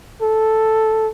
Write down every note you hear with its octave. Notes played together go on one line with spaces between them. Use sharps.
A4